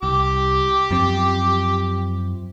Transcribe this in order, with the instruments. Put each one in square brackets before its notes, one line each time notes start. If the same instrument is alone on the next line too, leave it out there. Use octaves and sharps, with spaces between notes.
[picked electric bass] C2 [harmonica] G4 D6
[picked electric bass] F#2 F3 C4